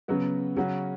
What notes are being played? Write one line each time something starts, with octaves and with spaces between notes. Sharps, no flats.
C#3 F#3 B3 F#4
C#3 F#3 C#4 F#4